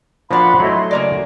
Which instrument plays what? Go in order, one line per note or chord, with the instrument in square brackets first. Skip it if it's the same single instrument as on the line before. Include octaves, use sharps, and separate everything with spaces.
[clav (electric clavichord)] F3 A#3 D4 [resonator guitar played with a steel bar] F#4 F5 [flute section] F#5 B5 C6
[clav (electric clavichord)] F#3 A3 E4 [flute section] D#5 C6
[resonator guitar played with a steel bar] C#3 A#3 D5